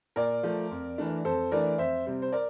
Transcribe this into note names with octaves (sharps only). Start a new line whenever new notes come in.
A#2 A#4 D5
F3 A3
F2
E3 A3 D4
F2 A4 C5
E3 A3 D4 A#4 D5
F2 C5 E5
C3 G3 C4
C5
A#4 D5